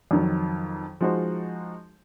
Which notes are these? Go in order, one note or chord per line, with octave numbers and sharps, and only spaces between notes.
F2 D#3 F#3
F3 G#3 D#4 F#4 C5